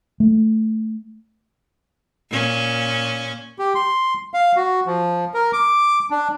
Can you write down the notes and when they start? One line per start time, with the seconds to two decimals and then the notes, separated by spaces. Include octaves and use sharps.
0.20 A3
2.31 A#2 C#4
3.59 G4
3.75 C6
4.34 F5
4.56 F#4
4.86 F3
5.34 A#4
5.53 D6
6.10 D4